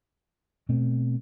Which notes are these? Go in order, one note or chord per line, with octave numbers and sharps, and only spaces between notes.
B2 A3 C4